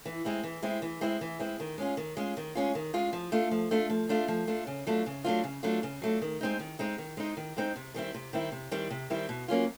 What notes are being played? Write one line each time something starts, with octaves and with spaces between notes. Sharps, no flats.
E3
G#3 C4 E4
E3
G#3 C4 E4
E3
G#3 C4 E4
E3
G#3 C4 E4
D#3
G#3 C#4 F4
D#3
G#3 C#4 F4
D#3
G#3 C#4 F4
D#3
G#3 C#4 F4
F3
A3 D4 F4
F3
A3 D4 F4
F3
A3 D4 F4
F3
A3 D4 F4
C#3
F#3 A3 D4 F4
C#3
F#3 A3 D4 F4
C#3
F#3 A3 D4 F4
C#3
F#3 A3 D4 F4
D#3
G#3 C4 D#4
D#3
G#3 C4 D#4
D#3
G#3 C4 D#4
D#3
G#3 C4 D#4
C3
D#3 G3 C4 E4
C3
D#3 G3 C4 E4
C3
D#3 G3 C4 E4
C3
D#3 G3 C4 E4
B2
F#3 A#3 C#4 F4